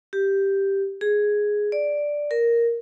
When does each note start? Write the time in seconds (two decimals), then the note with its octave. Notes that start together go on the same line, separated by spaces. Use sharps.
0.13 G4
1.01 G#4
1.72 D5
2.31 A#4